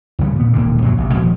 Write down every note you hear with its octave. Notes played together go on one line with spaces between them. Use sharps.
E2 D3 G3 B3
A#2 B3
E1 D#2 A#2 D3
A#1 F#2 F3 F#3
A1 C3
D#1 B2 F3 G#3